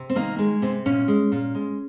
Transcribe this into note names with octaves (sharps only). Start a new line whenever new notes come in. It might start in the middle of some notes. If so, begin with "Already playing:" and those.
Already playing: C3
C4
D#3 A#3
G#3 A#3
C3 C4
A#2 C#4
G#3
A#2
G#3